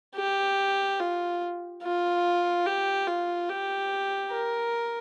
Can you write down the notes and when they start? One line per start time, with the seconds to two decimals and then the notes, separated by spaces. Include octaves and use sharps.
0.16 G4
1.00 F4
1.83 F4
2.66 G4
3.07 F4
3.49 G4
4.31 A#4